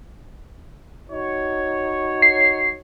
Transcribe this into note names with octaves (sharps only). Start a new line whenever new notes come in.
D#4 F#4 C#5
C7